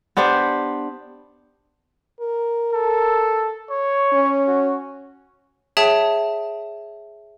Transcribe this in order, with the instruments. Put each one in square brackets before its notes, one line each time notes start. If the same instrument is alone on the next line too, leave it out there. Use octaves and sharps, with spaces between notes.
[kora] B3 D4 G4 C5
[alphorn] A#4
[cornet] A4
C#5
[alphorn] C#4
[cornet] F#4
[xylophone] G#4 C#5 E5 G5 A5